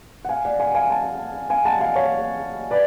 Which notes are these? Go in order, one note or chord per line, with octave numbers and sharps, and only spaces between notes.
F#5
F5 G#5
D5 F#5
F5 G#5
F5 G#5
F#5 A5
F5 G#5
F#5 A5
F5 G#5
C#5 F5
B4 D5